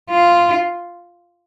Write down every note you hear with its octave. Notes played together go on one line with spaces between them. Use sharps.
F4